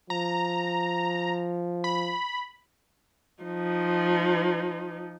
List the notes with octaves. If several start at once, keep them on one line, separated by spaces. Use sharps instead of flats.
F3 A#5
B5
F3 D#4